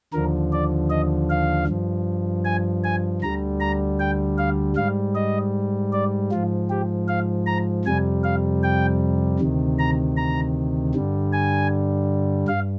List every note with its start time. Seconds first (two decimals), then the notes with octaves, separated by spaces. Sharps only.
0.13 D#2 D3 F3 A#4
0.52 D5
0.90 D#5
1.30 F5
1.67 G2 F3
2.45 G#5
2.84 G#5
3.22 D2 D3 G3 A#5
3.60 A#5
4.00 G5
4.38 F5
4.76 G#2 G3 F5
5.15 D#5
5.93 D5
6.32 G#2 F3 F4
6.70 G4
7.08 F5
7.46 A#5
7.85 F2 C3 G3 G#5
8.24 F5
8.63 G5
9.40 D2 C3 D#3
9.79 A#5
10.17 A#5
10.94 G2 D3 G3
11.33 G#5
12.48 G2 F5